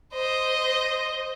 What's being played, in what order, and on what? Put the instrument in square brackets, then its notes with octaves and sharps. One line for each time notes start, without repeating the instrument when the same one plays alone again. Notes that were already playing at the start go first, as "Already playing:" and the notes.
[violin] C5 D#5